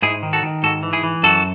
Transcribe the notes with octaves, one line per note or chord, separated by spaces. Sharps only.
G#2 E4 G#4
D#3
F#4 A4
D#3
G#2 F#4 A4
E3
E4 G#4
E3
F#2 F#4 A4